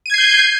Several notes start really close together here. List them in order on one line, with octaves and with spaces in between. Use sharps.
D#7 G#6 C7 G6